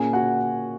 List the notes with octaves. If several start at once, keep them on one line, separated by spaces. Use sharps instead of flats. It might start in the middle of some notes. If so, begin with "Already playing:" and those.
Already playing: A#2 A#3 C#4 G#4 G#5
F#4 F#5